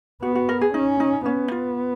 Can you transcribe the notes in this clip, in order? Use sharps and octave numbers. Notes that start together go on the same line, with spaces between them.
B3 F#4
F#4
A#4
G#4
C#4 D#4
D#4
B3 C#4
F4